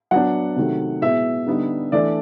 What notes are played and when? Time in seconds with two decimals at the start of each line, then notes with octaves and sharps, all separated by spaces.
0.11 F#3 B3 D4 F#5
0.56 C3 D#3 F#3 A3
1.01 B2 G#3 B3 E4 E5
1.47 D3 G3 B3 D#4
1.92 E3 A3 D4 D5